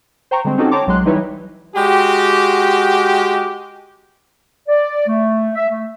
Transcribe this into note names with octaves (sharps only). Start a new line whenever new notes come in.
C5 G5 A#5 C#6
D3 G3 G#3 C4
C4 C#4 D#4 F#4 G4 A4
C#5 G5 A5 A#5 C6 D6
B1 F#3 G#3 C6 F#6
E3 G3 D#4 E4 B4 C#5
G#3 F#4 G4
D5
A3
E5
A3